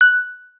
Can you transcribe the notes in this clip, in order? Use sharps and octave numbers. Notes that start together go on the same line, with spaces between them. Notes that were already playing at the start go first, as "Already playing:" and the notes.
F#6